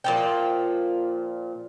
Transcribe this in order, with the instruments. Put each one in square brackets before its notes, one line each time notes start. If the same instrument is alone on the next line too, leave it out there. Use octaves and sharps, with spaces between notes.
[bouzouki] A#2 F3 G5